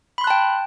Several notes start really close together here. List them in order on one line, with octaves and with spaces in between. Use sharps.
B5 C6 F#6 A5 G5